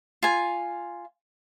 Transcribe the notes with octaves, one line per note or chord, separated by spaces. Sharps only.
F4 G#5